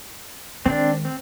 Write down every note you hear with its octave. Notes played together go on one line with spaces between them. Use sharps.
D#3 G#3 C4 D4
C4